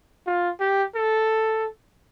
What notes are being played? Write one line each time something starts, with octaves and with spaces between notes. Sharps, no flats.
F4
G4
A4